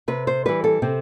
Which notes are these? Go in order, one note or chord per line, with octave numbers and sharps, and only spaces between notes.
C3 B4
C5
E3 G3 B4
A4
C3 C4